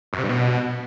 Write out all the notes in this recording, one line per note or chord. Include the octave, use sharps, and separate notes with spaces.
F#2
C3
G2
B2